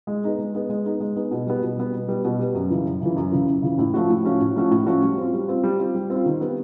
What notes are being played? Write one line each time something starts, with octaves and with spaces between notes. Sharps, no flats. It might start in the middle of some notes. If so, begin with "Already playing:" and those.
G#3
B3 D#4 G#4
G#3
B3 D#4 G#4
G#3
B3 D#4 G#4
G#3
B3 D#4 G#4
B2
G3 B3
B2
G3 B3
B2
G3 B3
B2
G3 B3
F#2
C#3 E3
F#2
C#3 E3
F#2
C#3 E3
F#2
C#3 E3
A2
F3 A3 C#4 F#4
A2
F3 A3 C#4 F#4
A2
F3 A3 C#4 F#4
A2
F3 A3 C#4 F#4
G3
C4 F4
G3
C4 F4
G3
C4 F4
G3
C4 F4
D#3
G3 B3